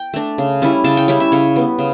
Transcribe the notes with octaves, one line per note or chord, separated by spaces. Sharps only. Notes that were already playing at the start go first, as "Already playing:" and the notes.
Already playing: G5
A3 D4
C#3
G3 C#4 E4
C#3 A5
G5
G3 C#4 E4 G5
E5
C#3 C#5
G3 B3
C#3